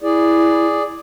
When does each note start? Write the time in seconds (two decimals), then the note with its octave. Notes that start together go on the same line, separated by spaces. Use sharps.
0.01 E4 G#4 D5